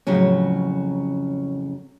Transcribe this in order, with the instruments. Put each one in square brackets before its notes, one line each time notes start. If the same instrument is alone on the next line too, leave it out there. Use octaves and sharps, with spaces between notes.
[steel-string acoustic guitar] F2 A2 C#3 F#3 C#4